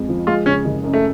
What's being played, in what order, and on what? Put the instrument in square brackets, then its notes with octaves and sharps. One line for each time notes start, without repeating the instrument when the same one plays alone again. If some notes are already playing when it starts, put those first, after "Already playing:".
Already playing: [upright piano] F2 G#3
F3
[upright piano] G#3 [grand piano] F4
[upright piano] C#3 [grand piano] C#4
[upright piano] F#1
F#2
[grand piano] A3